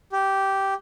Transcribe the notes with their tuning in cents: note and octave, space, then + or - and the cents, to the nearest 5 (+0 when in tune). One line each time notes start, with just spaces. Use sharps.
G4 -10